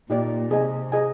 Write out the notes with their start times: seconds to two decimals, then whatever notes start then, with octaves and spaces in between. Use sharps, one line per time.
0.10 A#2 D#4 G4 D5
0.50 C3 G#4 D#5 G#5
0.92 G#4 D#5 G#5